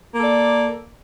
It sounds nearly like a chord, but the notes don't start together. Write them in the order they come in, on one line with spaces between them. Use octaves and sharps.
A#3 A4 D5